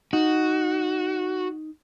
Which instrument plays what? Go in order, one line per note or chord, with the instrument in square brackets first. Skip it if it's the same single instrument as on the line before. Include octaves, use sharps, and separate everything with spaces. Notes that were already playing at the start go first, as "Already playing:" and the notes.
[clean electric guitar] D#4 [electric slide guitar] F#4